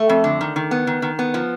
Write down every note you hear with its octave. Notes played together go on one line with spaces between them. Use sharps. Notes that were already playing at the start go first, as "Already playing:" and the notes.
Already playing: A3
F2
D3
D#3
D#3
B3
D#3
D#3
B3
F3